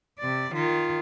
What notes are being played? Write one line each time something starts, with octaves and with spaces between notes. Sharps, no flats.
C3 D5
D#3 F4